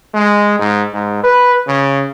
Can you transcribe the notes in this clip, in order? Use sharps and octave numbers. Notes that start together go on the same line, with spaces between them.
G#3
G#2
G#2
B4
C#3